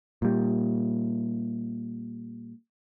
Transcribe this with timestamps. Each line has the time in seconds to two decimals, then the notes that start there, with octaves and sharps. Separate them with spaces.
0.22 A#2 G3